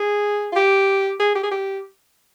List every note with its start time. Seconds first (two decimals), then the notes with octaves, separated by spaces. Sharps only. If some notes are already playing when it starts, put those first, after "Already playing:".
Already playing: G#4
0.52 F4
0.56 G4
1.20 G#4
1.35 G4
1.43 G#4
1.51 G4